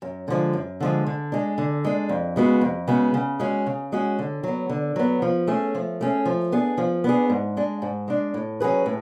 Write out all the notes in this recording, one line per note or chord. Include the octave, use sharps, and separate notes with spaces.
F#2
D3 F3 G#3
F#2
D3 F3 G#3
D3
G#3 D4
D3
G#3 D4
F2
C#3 G#3 B3 F#4
F2
C#3 G#3 B3 F#4
C#3
G#3 C#4 F#4
C#3
G#3 C#4 F#4
D3
F#3 B3
D3
F#3 B3
F3
A3 C#4 G#4
F3
A3 C#4 G#4
F3
B3 D4 G#4
F3
B3 D4 G#4
G#2
G#3 D4
G#2
G#3 D4
A2
F#3 C#4 G#4 B4
A2